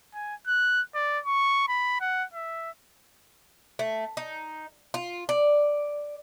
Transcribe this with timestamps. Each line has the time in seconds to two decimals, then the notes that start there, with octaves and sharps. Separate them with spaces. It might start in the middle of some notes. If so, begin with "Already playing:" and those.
0.14 G#5
0.47 F#6
0.95 D5
1.25 C#6
1.68 B5
2.01 F#5
2.34 E5
3.79 A3
4.17 D#4
4.94 F4
5.29 D5